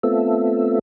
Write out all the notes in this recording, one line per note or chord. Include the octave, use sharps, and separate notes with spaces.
A3 B3 C4 F4 A4 E5